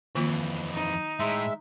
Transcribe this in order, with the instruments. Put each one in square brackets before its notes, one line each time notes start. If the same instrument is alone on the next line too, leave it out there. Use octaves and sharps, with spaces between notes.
[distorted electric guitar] F2 E3 [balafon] D#3 A#3 F4
[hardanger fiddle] D#4
[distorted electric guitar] A2 [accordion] G#3 E5 [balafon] A#5 C6